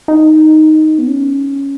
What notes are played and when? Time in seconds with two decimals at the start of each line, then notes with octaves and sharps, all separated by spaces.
0.08 D#4
0.98 B3
1.07 C#4